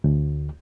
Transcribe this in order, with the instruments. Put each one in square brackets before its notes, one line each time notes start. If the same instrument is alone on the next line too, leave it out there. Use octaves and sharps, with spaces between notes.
[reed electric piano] D2